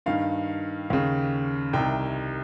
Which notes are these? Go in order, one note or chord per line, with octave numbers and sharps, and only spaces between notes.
G2 D#3 F5
D#2 C#3 F5
C2 C3 D#3 G5